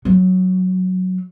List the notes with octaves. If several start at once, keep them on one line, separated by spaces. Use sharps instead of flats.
F#3